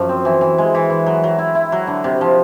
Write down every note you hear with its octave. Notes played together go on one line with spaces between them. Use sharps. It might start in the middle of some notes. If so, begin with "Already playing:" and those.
Already playing: F#2 F3
C4
E3
E3
G#3
E3
E3
F#3
F#3
E4
E4
F#3
D3
C3
F3